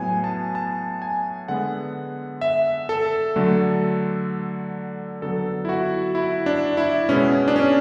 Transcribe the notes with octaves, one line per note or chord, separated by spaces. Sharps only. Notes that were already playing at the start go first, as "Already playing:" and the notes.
Already playing: A2 F#3 B3 G#5
A5
A5
G#5
D3 G#3 B3 F#5
E5
A4
D3 F#3 A3
D3 F#3 B3 A4
E4
F#4
E4
D4
E4
B2 G#3 B3 C#4
D4
C#4